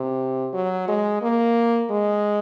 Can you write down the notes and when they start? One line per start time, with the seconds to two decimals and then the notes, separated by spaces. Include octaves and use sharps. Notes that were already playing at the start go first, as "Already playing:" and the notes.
Already playing: C3
0.53 F#3
0.88 G#3
1.22 A#3
1.90 G#3